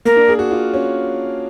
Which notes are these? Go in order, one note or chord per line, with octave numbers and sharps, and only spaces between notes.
A#3 A#4
D4
G#4
F#4
F4
C#4